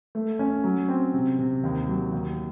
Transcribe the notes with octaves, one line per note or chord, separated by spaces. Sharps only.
A3
C#4
F#3
C4
C3
C3
D#2
F#3
D#2